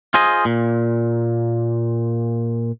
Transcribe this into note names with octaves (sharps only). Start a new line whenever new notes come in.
F4 G#4 C5 D#5
A#2